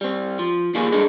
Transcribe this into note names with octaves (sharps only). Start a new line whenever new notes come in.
G3 C4
F3
D#3 G3 A#3 F4 G#4
G3 G#3 D4 D#4 G#4 A4